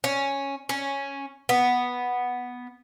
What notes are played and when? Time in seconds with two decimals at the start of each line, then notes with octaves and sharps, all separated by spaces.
0.04 C#4
0.69 C#4
1.49 B3